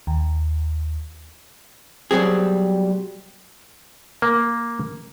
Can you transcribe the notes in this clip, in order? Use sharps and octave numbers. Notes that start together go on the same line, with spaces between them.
D#2
B2 F#3 G3 C4 G#4
A#3